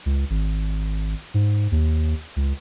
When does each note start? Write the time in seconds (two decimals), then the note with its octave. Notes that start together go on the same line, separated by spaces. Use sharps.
0.06 C#2
0.30 G#1
1.34 G#2
1.72 D#2
2.36 C#2